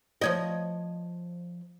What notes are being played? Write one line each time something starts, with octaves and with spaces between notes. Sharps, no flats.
F3 C#5 D#5